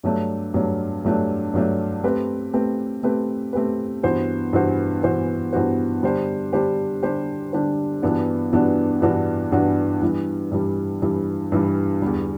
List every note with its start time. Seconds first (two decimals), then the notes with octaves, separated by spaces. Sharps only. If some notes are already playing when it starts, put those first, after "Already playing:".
0.04 G2 F#3 A3 D4
0.54 G2 F#3 A3 D4
1.04 G2 F#3 A3 D4
1.54 G2 F#3 A3 D4
2.04 A3 C4 G4 B4
2.53 A3 C4 G4 B4
3.03 A3 C4 G4 B4
3.53 A3 C4 G4 B4
4.03 G2 E3 B3 F#4 C5
4.53 G2 E3 B3 F#4 C5
5.03 G2 E3 B3 F#4 C5
5.53 G2 E3 B3 F#4 C5
6.03 D3 G3 D4 G4 C5
6.53 D3 G3 D4 G4 C5
7.03 D3 G3 D4 G4 C5
7.53 D3 G3 D4 G4 C5
8.02 G2 E3 B3 D4 F#4
8.52 G2 E3 B3 D4 F#4
9.02 G2 E3 B3 D4 F#4
9.52 G2 E3 B3 D4 F#4
10.02 G2 E3 G3
10.51 G2 E3 G3
11.02 G2 E3 G3
11.52 G2 E3 G3
12.02 E2 D3 G3